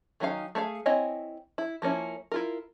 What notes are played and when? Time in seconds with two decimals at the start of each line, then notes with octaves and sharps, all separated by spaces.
0.20 D#3 F#3 C#4 D#4 F5
0.55 A3 G#4 C#5 F5
0.86 C4 E4 C#5 D#5 G#5
1.58 E4
1.82 F3 A#3 C#4 E4
2.32 E4 F4 A#4